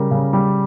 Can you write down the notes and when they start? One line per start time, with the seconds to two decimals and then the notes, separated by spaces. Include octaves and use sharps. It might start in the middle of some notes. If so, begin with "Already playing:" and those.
Already playing: C#3 G3 A#4
0.11 C#3
0.33 G3